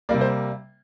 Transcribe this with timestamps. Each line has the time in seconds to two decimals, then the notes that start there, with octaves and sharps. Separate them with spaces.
0.09 C3 G3 A#3 D5
0.21 C5